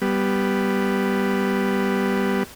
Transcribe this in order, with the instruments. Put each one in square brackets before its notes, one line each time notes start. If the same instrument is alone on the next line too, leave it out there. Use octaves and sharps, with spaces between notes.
[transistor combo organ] G3 B3